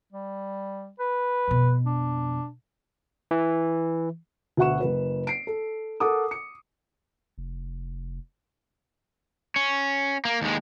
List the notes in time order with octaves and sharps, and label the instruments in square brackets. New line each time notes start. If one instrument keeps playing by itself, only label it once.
[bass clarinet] G3
B4
[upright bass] F2 B2
[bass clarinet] D4
[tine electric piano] E3
[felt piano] D2 B2 E5 F#5 C#6 E7
F#1 B4
C7 D7
A4
A4 A#4 F#5 D6 D#6
C#7
[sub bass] F1
[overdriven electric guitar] C#4
A#3
D#2 G#3